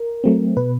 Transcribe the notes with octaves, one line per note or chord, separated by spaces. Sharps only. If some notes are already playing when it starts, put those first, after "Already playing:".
Already playing: A#4
F#3 A3 C4
B2 B4